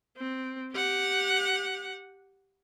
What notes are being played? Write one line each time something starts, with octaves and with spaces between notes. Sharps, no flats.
C4
G4 F#5